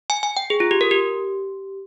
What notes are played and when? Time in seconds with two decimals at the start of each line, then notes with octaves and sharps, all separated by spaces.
0.10 G#5
0.23 G#5
0.37 G5
0.50 G#4
0.60 F4
0.71 G4
0.81 A#4
0.91 G4